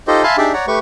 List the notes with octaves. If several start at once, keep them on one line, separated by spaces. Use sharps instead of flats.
D#4 F4 G4 A4 C5 D#5
E5 F5 G#5 A5 B5 C6
D4 D#4 G4 G#4 D5 E5
C#5 D5 F#5 A#5
A3 G4 B4 C#6